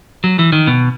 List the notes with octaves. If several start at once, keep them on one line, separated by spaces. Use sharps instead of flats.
F#3
E3
D#3
B2